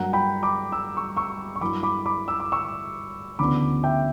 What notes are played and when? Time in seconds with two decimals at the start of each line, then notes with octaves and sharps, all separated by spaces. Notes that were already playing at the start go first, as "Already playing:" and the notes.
Already playing: G2 F#3 A#3 F#5 A#5
0.13 G5 B5
0.43 B5 D6
0.72 E6
0.97 C#6 E6
1.17 C#6 E6
1.56 C#6
1.61 G2 F#3 A#3 E4 B5 D6
1.83 B5 D6
2.06 B5 D6
2.28 E6
2.40 D6
2.52 C#6 E6
3.39 D2 C#3 E3 B3 D4 B5 D6
3.83 E5 G5